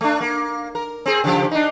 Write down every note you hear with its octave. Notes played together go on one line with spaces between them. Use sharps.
A3 D4
A#3
A#4
C4 G#4
C#3 F3 G4
D4 D#4